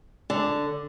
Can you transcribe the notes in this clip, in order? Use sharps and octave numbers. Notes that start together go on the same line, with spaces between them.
D3